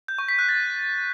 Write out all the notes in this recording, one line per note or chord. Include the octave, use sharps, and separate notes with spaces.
G6
C#6
B6
F#6
A6